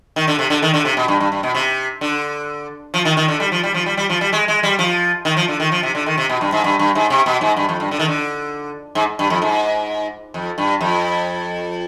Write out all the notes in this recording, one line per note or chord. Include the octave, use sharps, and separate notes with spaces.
D#3
D3
C3
D3
D#3
D3
C3
B2
G2
G2
G2
B2
C3
D3
F3
D#3
D#3
D3
G3
F3
G3
F3
G3
G3
F3
G3
G#3
G#3
G3
F3
D#3
F3
D3
D#3
F3
C3
D3
D#3
C3
B2
G2
G#2
G2
G2
G#2
C3
B2
G#2
G2
F2
G2
D3
D#3
D3
G#2
G2
F2
G#2
F2
G2
F2